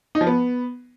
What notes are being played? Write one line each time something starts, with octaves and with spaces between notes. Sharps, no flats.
D#4
F3
B3